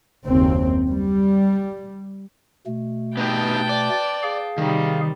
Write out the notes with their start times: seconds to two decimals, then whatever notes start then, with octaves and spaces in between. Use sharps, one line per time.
0.25 F#1 D#2 C4
0.87 G3
2.66 B2 A3
3.17 B3 D#4 G4 B4 G5 A5
3.69 D5
4.23 G#4 F5
4.58 C3 D#3 G3